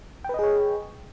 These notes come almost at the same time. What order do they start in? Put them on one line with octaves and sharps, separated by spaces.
G5 B4 D#5 G#4 C#5